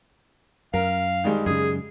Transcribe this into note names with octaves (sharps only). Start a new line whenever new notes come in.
F#2 A#4 F5
D#3 G3 G#3
F#2 C#3 G#4